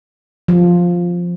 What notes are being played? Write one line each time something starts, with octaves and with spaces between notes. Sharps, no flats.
F3